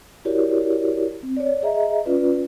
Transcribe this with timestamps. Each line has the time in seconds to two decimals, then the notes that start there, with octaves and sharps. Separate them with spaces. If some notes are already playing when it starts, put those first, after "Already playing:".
0.25 E4 F#4 G4 A#4 C#5 D5
1.23 C4
1.37 C#5 D5
1.63 G#4 D#5 E5 A#5
2.05 C#4 F4 B4 D5